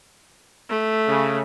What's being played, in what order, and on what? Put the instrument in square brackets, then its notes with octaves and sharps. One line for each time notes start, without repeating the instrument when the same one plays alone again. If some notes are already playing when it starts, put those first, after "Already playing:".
[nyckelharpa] A3
[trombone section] C#3